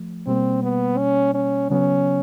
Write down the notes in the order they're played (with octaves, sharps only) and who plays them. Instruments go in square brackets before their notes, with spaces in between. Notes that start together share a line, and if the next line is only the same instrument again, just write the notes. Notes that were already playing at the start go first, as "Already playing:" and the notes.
Already playing: [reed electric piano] F3 A3
[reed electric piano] B2 G3 A#3 [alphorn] C4
[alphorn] B3
C#4
C#4
[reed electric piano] C#3 F#3 B3 [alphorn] C#4